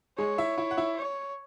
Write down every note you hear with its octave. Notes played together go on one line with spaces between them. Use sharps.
G#3 G#4 C#5
E4 E5
E4 E5
F#5
E4 E5
C#5